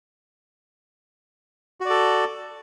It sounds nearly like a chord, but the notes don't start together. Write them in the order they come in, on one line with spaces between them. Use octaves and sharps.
F#4 D5 A4